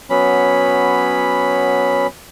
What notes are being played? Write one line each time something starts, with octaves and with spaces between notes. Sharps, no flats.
F#3 B3 C#4 B5